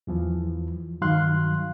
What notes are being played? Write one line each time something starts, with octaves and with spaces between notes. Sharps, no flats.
E2 E3 F3
G2 D#3 F#3 F5 C6 F#6